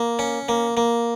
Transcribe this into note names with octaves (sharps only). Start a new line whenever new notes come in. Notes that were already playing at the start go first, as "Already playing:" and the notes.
Already playing: A#3
C#4
A#3
A#3